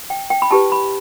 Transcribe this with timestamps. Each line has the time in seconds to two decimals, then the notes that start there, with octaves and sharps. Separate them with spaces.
0.10 G5
0.30 G5
0.42 B5
0.51 E4 G4 B4 A5
0.72 B5